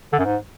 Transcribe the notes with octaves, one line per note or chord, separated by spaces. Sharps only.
D3
F#2
G#2